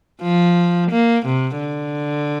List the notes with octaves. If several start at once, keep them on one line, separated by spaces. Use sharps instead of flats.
F3
A#3
C3
D3